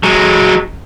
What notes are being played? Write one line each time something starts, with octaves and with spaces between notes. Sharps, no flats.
F#3 G#3